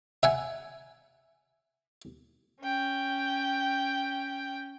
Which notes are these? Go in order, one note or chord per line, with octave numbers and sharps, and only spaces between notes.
E5 F#5 G#5
C#4 G5